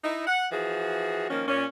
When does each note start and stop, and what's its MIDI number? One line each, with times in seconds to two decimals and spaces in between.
0.03 0.24 63
0.03 0.24 64
0.27 0.47 78
0.52 1.27 52
0.52 1.27 53
0.52 1.27 66
0.52 1.27 68
1.30 1.48 51
1.30 1.48 53
1.30 1.48 58
1.30 1.48 61
1.48 1.64 46
1.48 1.64 61